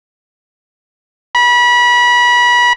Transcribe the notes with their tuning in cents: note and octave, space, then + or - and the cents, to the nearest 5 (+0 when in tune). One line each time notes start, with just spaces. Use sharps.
B5 -30